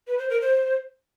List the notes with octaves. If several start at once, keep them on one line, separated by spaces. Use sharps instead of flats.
B4
C5
A#4
C5